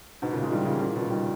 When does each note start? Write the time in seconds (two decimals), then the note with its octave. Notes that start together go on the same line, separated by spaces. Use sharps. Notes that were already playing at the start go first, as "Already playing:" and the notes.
0.22 G#2 B2
0.33 A#2 C#3
0.41 E3 G#3
0.52 D#3 G3
0.66 C#3 E3
0.81 A#2 C#3
0.95 B2 D#3
1.10 D#3 G3